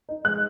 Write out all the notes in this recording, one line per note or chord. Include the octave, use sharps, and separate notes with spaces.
D#4
G#3 F#6